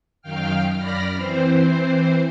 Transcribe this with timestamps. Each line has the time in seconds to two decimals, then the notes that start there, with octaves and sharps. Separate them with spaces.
0.22 F#2 D#3 F5 G5 F6
0.77 F#2 D5 B5 F6 A#6
1.14 E3 C4 C5